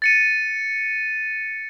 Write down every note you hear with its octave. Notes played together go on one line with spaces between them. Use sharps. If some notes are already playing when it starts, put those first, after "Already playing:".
A6 C#7 D#7